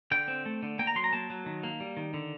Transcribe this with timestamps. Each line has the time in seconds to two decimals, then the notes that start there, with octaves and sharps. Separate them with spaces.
0.11 D3 G5
0.28 C4
0.46 A3
0.63 D3
0.79 A#3 G5
0.87 A#5
0.95 F#3 C6
1.04 A#5
1.13 A#3 A5
1.30 F#3
1.46 D#3
1.63 A#3
1.80 G3
1.97 D#3
2.14 D3